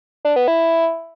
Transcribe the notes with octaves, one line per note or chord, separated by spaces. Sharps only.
D4
B3
E4